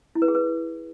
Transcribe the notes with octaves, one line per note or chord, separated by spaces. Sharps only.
E4
B4
G#4
B4